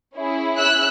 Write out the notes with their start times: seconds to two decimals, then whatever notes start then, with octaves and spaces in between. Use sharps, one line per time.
0.16 C#4 E4 G#4
0.58 E6 F#6